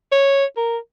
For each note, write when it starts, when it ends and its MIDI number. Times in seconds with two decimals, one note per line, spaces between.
0.12 0.45 73
0.57 0.78 70